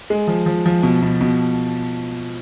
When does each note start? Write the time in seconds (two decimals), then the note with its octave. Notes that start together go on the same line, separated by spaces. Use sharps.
0.10 G#3
0.27 F3
0.46 F3
0.66 F3
0.83 B2
1.02 B2
1.21 B2